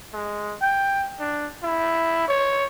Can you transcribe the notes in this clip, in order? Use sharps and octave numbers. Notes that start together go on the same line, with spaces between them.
G#3
G5
D4
E4
C#5